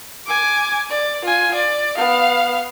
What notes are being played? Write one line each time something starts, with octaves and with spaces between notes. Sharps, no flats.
G#5 D6
D5
F4 G#5
D5
B3 F5